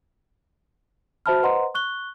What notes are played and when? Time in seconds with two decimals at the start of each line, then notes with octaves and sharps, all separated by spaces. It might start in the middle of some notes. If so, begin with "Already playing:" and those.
1.26 F#4 C5 E5 A5 B5 F6
1.43 B4 C5 D#5 F#5 A#5 C6
1.74 C#6 F#6 G7